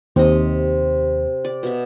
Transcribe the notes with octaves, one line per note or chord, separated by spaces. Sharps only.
D#2 C3 D#5
D5
B2 E5